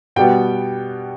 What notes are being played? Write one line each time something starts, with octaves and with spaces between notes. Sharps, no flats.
B2 G3 B3 G5